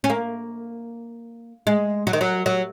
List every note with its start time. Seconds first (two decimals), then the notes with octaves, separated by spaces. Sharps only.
0.04 C#4
0.10 A#3
1.67 G#3
2.07 F#3
2.13 D#3
2.21 F#3
2.46 F#3